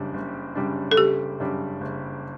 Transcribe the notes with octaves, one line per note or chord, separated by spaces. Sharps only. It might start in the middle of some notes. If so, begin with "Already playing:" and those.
Already playing: F#1 F#2 C#3 G3 D4
F#1
F#2 C#3 G3 D4
A4
F#1 G4
F#2 C#3 G3 D4
F#1